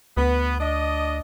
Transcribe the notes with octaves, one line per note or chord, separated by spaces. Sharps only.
D2 B3
D4 D#5